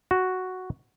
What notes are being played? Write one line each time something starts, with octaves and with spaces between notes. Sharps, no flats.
F#4